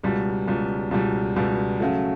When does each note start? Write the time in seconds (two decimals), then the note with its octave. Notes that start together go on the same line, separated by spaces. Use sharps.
0.03 C#2 B2 G3
0.47 C#2 B2 G3
0.91 C#2 B2 G3
1.36 C#2 B2 G3
1.80 C#3 F#3 A3